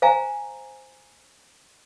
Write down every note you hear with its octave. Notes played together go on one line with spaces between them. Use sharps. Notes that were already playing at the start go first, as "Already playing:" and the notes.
C5 F5 G#5 A#5